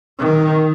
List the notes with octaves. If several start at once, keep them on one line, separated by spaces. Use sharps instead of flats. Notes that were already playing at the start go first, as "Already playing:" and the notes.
D#3